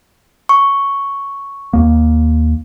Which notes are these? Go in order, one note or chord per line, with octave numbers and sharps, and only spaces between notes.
C#6
D#2 A#3